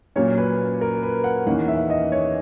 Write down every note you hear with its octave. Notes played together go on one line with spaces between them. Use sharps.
A#2 F#3 A#3 C#4 C#5
B4
A#4
B4
F#5
E2 D#3 A#3 C#4 F#5
E5
D#5
C#5